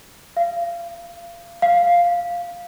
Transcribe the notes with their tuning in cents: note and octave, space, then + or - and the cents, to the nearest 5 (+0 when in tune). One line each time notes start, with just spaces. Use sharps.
F5 -30
F5 +0